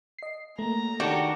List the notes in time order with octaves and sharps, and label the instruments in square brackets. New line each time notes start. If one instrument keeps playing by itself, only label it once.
[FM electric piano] D#5 C7
[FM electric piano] A3 A#3 [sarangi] A#5
[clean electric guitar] D#3 D4 A4 [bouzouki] F#4 G4